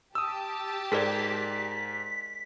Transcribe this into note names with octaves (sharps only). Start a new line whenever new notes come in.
G4 A5 D#6 E6
G#2 G#4 A#4 D5 B6